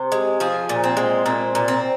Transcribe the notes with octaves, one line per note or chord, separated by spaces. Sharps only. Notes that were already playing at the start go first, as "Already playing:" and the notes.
Already playing: C3 C5
G#3
F3 G#4
A#2
C4
G#3
A#2 C4
A#2
C4